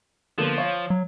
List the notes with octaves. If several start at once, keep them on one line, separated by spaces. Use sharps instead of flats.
D3 F3 A#3 B3
C#5 F5
F#3